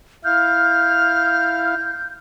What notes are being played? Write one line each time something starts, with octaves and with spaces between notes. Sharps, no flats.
E4 F5 F6 G6